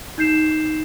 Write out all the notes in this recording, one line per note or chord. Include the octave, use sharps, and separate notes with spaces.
D#4 G6 C7 E7